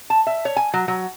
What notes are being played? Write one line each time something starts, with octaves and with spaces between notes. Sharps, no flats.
A5
E5
C#5
G#5
F#3
F#3